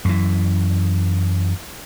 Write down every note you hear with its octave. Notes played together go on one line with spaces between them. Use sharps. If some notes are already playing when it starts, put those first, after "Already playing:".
F#2 E3